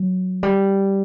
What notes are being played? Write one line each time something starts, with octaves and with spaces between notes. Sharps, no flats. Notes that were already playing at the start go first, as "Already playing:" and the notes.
Already playing: F#3
G3